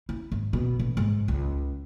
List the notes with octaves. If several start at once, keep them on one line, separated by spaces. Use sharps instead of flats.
E4
G#1
B2
A1
G#2
C#2